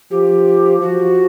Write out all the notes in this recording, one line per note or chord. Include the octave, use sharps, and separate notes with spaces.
F3 G4
F3 F#4